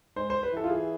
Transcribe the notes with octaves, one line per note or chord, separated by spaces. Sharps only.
G#2 C5
C5
B4
E3 A4
F4
G#4